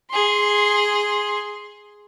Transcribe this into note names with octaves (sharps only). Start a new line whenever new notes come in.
G#4 C6